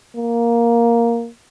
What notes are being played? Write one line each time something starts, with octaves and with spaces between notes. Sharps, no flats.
A#3